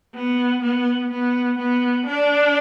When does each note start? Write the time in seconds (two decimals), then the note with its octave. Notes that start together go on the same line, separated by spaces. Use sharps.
0.15 B3
0.62 B3
1.11 B3
1.59 B3
2.06 D4